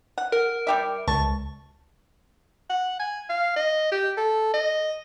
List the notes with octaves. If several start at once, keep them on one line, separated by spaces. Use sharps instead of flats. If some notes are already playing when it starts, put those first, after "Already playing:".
F#5
A#4 F#5
G3 G4 E5
C#2 A5 C#6
F#5
G#5
F5
D#5
G4
A4
D#5